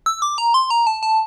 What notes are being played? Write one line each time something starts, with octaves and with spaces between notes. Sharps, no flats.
E6
D6
A#5
C6
A#5
A5
A5